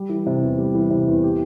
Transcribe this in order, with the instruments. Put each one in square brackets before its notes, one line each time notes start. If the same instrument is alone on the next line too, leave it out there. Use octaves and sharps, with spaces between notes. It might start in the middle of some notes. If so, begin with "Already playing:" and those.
Already playing: [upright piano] G3
E3
C3
E2
G3
E3
C3
E2
G4